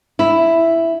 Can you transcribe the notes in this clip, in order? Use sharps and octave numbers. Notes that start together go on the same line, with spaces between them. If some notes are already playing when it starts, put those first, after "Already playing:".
E4